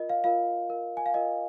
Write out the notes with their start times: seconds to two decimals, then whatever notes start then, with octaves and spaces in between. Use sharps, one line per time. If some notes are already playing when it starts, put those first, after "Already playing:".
Already playing: F4 A#4 D#5
0.09 F5
0.24 F4 A#4 F5
0.70 F4 A#4
0.97 G#5
1.06 F5
1.14 F4 A#4 D#5